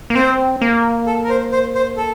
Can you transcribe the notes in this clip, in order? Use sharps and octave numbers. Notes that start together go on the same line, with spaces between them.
A#3
C4 C5
A#3
A4
A#4
C5
C5
C5
A4